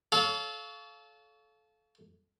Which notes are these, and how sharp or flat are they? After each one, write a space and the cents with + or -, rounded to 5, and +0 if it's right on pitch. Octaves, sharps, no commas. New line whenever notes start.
A4 -25 C#5 +25 F5 +0